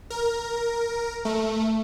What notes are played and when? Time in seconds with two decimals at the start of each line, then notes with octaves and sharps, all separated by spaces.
0.10 A#4
1.25 A3